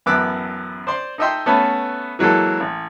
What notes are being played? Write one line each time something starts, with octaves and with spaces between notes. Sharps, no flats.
A1 F#2 B3 D6 E6 F#6
C5 D5 C6
D#4 A4 D#5 E5 G5 C6
A3 B3 C#4 A4 B4
E3 F#3 G#3 A#3 A4
A1